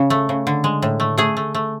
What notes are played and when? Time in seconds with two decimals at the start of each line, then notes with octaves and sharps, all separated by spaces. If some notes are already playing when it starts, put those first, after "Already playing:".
Already playing: C#3
0.10 A3
0.29 C#3
0.47 D3
0.64 G#3
0.82 A2
1.00 A3
1.18 A3 G#4
1.37 A3
1.54 A3